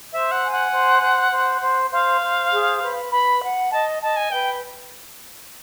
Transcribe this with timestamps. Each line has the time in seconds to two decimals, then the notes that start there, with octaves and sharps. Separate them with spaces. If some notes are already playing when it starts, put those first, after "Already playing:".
0.12 C5 E5
0.32 F#5
0.43 G#5
0.52 F#5
0.73 C5
1.02 C5
1.31 C5
1.62 C5
1.92 C5 F5
2.22 C5
2.51 G#4
2.81 B4
3.12 B4 B5
3.41 F#5
3.71 D#5 A5
4.02 D#5 A5
4.16 G#5
4.31 B4 G5